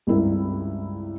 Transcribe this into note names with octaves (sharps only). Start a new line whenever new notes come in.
C#2 G2 C4 E4 A#4